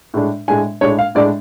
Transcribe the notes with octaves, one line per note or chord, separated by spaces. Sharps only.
A2 G#3 D4
A2 G#3 D4 G#5
A2 G#3 D4 C#5
F5
A2 G#3 D4 D5